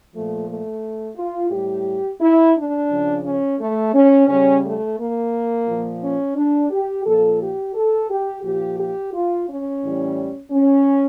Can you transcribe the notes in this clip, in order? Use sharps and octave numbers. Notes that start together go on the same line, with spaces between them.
A#2 F3 A3
A3
F4
A2 G3 G4
E4
D4
C#3 F3
C#4
A3
C#4
C#3 G3 C#4
A3
A#3
A#2 F3
C#4
D4
G4
A#2 F3 A4
G4
A4
G4
A#2 F3 G4
G4
F4
C#4
A2 E3 G3
C#4